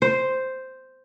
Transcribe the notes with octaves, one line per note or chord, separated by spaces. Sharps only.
C5